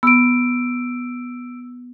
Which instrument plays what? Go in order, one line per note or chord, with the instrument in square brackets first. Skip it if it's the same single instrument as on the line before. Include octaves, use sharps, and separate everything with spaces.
[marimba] B3 [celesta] E6 D7